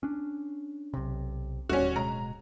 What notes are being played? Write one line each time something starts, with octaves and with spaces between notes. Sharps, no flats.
C#4 D4
B1 C3
D1 D#2 G3 C#4 F#4
D1 B2 G#3 A#5